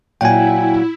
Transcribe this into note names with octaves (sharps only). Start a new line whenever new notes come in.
A#2 F#3 E4 G5 G#5